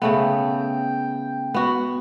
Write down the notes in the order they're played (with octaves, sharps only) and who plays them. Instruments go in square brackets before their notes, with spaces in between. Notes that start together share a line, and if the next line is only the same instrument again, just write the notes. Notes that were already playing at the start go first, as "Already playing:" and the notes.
[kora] C#3 A3 B3 [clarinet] G5
[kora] B3 F#4